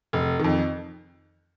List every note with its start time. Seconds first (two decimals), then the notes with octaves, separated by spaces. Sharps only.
0.13 F1
0.39 F2 D#3